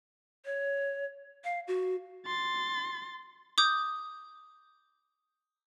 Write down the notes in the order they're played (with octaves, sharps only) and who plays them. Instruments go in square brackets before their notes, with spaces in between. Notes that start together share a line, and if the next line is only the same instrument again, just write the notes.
[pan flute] C#5
F5
F#4
[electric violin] C6 A6
[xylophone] D6 D#6 G6